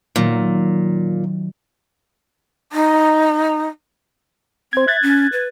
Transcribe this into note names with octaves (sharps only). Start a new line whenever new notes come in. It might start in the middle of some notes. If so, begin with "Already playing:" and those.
A#2 D#3 F#3 F4
D#4
C4 C5 G#6
E5 F#6 G#6 A6
C#4
B4